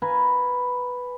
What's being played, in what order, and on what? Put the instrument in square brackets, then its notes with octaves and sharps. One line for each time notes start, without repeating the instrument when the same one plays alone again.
[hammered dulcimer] B4 F5 G#5 A#5